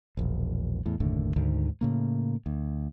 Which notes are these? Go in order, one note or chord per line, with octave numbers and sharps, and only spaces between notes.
E1 A#1
E2 A2
F#1 D#2 A2 D3
D2 G#2 D3 D#3
A2 C#3 A#3
D2